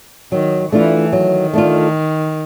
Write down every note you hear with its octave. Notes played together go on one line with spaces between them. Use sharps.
D#3 F#3
E3 A3 D4 F4
D#3 F#3
A3 D4 F4